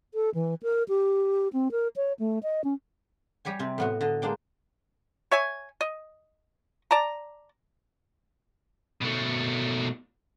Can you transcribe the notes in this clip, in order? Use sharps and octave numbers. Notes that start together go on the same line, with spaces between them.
A4
E3
A#4
G4
C4
A#4
C#5
A3
D#5
C#4
G3 G4 C#5 G#5
C3 C4
A2 B3 F#4
D3 D#5
G#3 A#3 D4 G5
C#5 E5 G#5
D#5
D5 A5 A#5
B2 A3